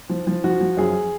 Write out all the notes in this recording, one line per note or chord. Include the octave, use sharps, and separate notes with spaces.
F3
F3
F3 F#4
F3
F#2 G#4